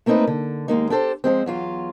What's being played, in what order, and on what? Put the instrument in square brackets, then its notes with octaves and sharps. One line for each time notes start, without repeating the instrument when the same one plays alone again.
[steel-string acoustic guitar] A3 A#3 C4 D#4 A#4 B4
D3
D#2 G#3 A#3 D#4
D4 G4 A4 C5
F3 F#3 G#3 C4
E2 F#3 F4